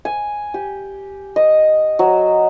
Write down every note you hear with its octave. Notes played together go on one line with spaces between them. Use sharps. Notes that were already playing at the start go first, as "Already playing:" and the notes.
G#5
G4
D#5
F#3